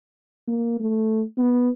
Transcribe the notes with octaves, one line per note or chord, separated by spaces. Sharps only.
A#3
A3
B3